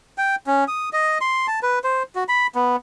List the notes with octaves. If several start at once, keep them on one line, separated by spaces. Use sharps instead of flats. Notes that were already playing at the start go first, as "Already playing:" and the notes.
G5
C#4
D#6
D#5
C6
A5
B4
C5
F#4
B5
B3